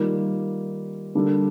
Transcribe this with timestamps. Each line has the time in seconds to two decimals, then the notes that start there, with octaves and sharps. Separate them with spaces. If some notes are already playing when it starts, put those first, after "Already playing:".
Already playing: D#3 G3 A#3 F4
1.15 D3 G3 A#3 D4 A4